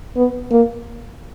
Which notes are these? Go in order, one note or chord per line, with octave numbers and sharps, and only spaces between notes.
B3
A#3